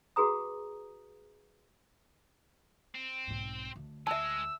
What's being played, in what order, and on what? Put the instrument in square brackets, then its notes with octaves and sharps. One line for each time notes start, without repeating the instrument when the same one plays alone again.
[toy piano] F#4 G#4 B4 A#5 D#6
[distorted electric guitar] C4
[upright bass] B1 G#2
D2
[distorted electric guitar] G#3 [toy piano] E5 A5 [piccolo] E6